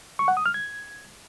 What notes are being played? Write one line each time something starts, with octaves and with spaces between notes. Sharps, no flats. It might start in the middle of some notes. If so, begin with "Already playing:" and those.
C#6
F#5
D#6
F6
G#6